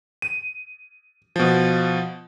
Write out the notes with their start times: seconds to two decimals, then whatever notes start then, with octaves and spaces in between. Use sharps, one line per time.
0.22 D#7
1.36 B2 F3